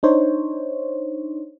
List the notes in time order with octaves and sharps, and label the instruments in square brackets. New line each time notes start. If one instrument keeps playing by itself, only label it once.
[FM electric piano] D4 D#4 C5 C#5